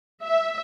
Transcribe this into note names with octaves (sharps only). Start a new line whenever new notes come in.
E5